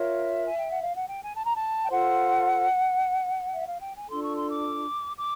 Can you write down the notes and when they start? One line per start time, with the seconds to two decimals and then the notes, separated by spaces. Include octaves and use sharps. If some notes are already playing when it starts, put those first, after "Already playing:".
Already playing: F4 A#4 C#5 E5
0.44 G#5
0.57 G5
0.69 F#5
0.81 F5
0.95 F#5
1.08 G5
1.22 G#5
1.35 A5
1.45 A#5
1.55 A5
1.85 G5
1.90 F4 A4 C5 F#5
3.54 E5
3.67 F5
3.81 G5
3.95 G#5
4.08 D4 F4 A4 C6
4.23 C#6
4.37 C6
4.49 D6
5.17 D6